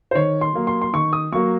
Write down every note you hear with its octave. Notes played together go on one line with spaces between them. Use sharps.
C5
D#3 C#5
C6
F#3 A#3
C6
C6
D#3 C#6
D#6
F#3 A#3 C#6